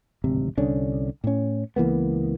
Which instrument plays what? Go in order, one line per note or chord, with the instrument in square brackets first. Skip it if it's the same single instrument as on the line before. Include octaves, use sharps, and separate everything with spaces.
[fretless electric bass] D1 G#1 C3
C2 D3 C#4 D4
A2 C#4
C#2 E3 A#3 B3